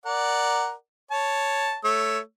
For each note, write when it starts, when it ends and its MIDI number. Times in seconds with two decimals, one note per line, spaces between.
0.06 0.73 70
0.06 0.73 74
0.06 0.73 78
1.11 1.76 73
1.11 1.76 81
1.84 2.19 57
1.84 2.19 73
1.84 2.19 88